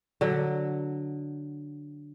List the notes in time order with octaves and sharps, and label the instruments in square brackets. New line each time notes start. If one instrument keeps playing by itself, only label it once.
[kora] D3 F#3